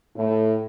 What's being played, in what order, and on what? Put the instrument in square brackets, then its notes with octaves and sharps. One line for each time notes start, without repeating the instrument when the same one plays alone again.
[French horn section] A2